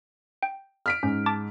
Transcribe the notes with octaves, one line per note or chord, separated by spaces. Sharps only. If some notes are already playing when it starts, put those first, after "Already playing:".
G5
F6 B6 D7
G#2 C#4
A5 D6 A6